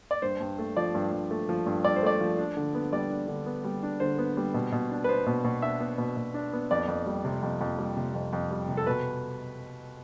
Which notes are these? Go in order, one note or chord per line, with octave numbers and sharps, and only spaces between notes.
D5
G2 C5
G2
A3
F3 D5
G2
G2
A3
F3
G2
G2 D5
C5
A3 D5
F3
D4
D3
B3
G3 D5
D4
D3
B3
G3
D4
D3 C5
B3
G3
B2
B2
D4
B4
B3 C5
B2
B2
D4 E5
B3
B2
B2
D4
B3
F2 D5
F2
G3
C3
F2
F2
G3
C3
F2
F2
G3
C3
A4
B2 B4